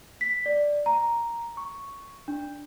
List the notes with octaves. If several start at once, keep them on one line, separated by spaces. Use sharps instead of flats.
B6
D5
A#5
C#6
D4